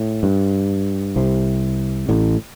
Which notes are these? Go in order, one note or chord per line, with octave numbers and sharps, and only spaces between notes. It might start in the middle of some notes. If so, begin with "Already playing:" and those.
Already playing: A2
G2
C2 C3
A1 A2